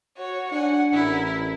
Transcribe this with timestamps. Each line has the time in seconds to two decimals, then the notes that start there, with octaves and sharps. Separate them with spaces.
0.17 F#4 C#5
0.52 D4 F#5 G#5
0.93 A1 E4 A#4